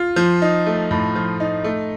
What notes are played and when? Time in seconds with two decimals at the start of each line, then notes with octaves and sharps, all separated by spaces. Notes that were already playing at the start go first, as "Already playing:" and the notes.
Already playing: F4
0.16 F3
0.42 D#4
0.66 A3
0.91 A2
1.15 F3
1.40 D#4
1.64 A3